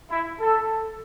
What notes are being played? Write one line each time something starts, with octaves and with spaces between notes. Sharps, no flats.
E4
A4